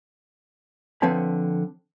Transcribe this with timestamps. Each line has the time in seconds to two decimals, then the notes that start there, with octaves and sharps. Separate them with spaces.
1.02 D3 F3 C4 B4 C#5 A5